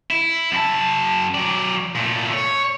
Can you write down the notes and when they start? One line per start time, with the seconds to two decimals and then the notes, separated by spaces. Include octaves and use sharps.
0.10 E4
0.52 F#2 A5
1.35 F#3 D5
1.95 A#2 A3
2.33 C#5